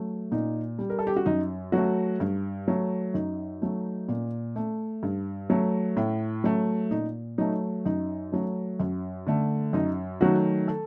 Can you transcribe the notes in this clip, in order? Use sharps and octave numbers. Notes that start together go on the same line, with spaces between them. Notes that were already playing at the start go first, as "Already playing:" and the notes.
Already playing: F#3 A3
A#2 D#4
G3
A#4
A4
G4
F#4
F#2 D#4
F#3 A3 F#4
G2
F#3 A3
F#2 D#4
F#3 A3
A#2
A3
G2
F#3 A3
A2
F#3 A3
A#2 D#4
F#3 A3 D#4
F#2 D#4
F#3 A3
F#2
D3 A3
F#2 D#4
D#3 F#3 A3 F#4
A4